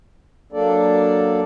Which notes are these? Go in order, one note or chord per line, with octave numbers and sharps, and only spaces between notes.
F#3 A#3 D4 A4 D5